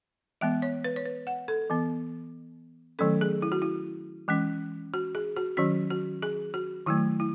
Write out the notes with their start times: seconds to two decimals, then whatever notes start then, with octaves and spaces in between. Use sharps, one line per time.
0.41 E3 G#3 B3 E5
0.62 C#5
0.84 B4
0.96 C#5
1.05 B4
1.27 F#5
1.48 A4
1.70 E3 B3
2.99 D#3 F#3 A3 C#4 A4
3.21 G#4
3.42 E4
3.52 F#4
3.62 E4
4.28 E3 G#3 C#4
4.94 F#4
5.15 G#4
5.37 F#4
5.57 D#3 F#3 C#4 F#4
5.90 F#4
6.22 G#4
6.54 F#4
6.86 D#3 F#3 A3 E4
7.20 E4